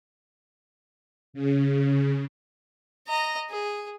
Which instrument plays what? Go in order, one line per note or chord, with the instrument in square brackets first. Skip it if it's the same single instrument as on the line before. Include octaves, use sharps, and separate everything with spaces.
[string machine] C#3
[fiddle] D#5 A#5
G#4